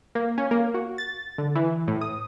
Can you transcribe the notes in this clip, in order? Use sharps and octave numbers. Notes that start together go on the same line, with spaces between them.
A#3
C#4
A#3
F#4
A6
D3
E3
A2
D#6